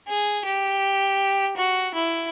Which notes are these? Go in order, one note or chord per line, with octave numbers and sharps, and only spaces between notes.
G#4
G4
F#4
E4